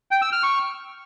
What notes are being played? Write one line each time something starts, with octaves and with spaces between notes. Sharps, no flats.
G5
E6
F6
C#6